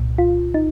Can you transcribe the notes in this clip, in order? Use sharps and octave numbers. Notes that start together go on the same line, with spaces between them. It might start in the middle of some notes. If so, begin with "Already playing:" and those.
Already playing: C2 A#2
F4
D#4